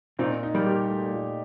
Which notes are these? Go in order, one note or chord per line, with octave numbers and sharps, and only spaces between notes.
A#2 C4 D#4
D#4
G3 A#3
G4
A3
A#2